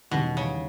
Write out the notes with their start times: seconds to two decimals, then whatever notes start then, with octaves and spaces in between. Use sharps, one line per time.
0.11 E2 B2 D#3 G3 C#4
0.37 C#3